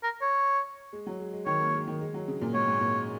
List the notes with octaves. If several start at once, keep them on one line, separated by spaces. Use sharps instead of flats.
A#4
C#5
G#3
F#3
G#3
G#3
D#3 C#5
A#3
G#3
D#3
G#3
F#3
C#3
A#2
G#2 C#5
G#2
A#2